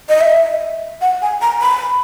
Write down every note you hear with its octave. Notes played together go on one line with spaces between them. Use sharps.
D#5
E5
F#5
G#5
A#5
B5